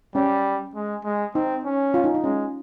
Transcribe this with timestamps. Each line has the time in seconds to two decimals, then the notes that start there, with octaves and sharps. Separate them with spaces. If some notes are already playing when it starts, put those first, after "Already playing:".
0.15 G3 C#4
0.75 G#3
1.04 G#3
1.35 C4 D#4
1.65 C#4
1.94 F4
2.04 D#4
2.14 D#4
2.24 G#3 C#4